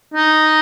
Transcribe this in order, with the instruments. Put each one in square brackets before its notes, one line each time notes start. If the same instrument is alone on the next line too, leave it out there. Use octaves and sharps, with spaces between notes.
[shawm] D#4